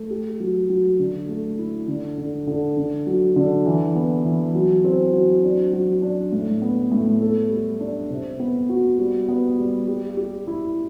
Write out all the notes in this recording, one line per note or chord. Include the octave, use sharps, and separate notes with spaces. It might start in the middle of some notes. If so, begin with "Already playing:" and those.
Already playing: A3
G4
F#3
F#3
D3
A3
E4
D3
D3
D3
D3
F#3
D3
E3
B3
E3
F#3
C4
F#3
D4
F#3
D4
A2
B3
A2
A4
G3
D4
C3
B3
F#4
G3
B3
G3
G4
G4
E4